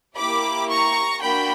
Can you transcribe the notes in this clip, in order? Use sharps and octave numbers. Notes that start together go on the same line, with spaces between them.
A#3 E4 G4 B5 D6
A#5 C#6
A#3 D4 F#4 G5 B5